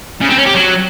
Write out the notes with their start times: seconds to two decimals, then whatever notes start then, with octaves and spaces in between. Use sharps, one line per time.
0.21 C#3
0.29 C4
0.38 C#4
0.46 G4
0.54 F#3